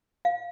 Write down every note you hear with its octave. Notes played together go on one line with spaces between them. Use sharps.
F5